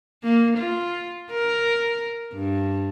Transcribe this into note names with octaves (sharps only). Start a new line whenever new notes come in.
A#3
F4
A#4
G2